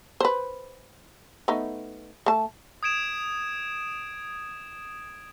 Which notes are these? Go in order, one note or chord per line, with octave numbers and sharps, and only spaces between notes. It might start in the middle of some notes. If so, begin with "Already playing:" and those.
B4 C5
A3 B3 D#4
A3 A5
D#6 G#6 D7 E7